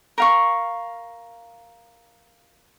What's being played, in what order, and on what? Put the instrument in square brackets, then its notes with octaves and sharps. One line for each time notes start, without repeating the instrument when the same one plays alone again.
[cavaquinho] A#4 F5 C#6